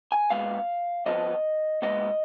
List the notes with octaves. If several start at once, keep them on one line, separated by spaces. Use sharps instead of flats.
G#5
A#2 G#3 B3 F5
F2 F3 B3 D#5
A#2 G#3 B3 D#5